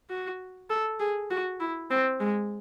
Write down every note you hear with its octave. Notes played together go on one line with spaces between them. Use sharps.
F#4
A4
G#4
F#4
E4
C4
G#3